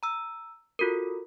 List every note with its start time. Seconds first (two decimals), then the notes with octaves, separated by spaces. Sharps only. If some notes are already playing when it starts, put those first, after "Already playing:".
0.03 A#5 E6
0.79 F4 F#4 A4 A#4